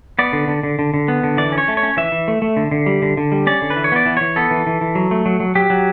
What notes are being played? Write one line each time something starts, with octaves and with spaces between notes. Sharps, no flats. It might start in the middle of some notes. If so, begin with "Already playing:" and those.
B3 D5
D3
D3
D3
D3
D3
B3
D3
E3 D5
C#4
C#5
A3
C#5
C#4
E3 E5
E3
A3
A3
D3
D3
G3
D3
D3
G3
C#4 D5
D3
B4
E3
C#5
B3 D5
E3
E3 C#5
B3 A4
E3
E3
E3
F#3
A3
F#3
F#3
F#3 G4
F#3